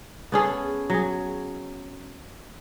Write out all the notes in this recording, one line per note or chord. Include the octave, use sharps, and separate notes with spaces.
B3 C#4 G#4 A4
F#3 G#4